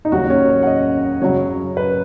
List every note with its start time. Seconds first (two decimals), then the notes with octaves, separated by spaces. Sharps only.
0.05 D#4
0.12 D#2 C#3 F#3 F#4
0.30 C#4
0.49 C#5
0.62 F#5
0.67 D#5
1.22 F#2 C#3 F#3 C#5
1.77 B4